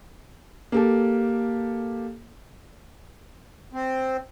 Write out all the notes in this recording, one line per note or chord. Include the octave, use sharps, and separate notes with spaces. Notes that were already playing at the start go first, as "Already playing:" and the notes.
A#3 G4 A4
C4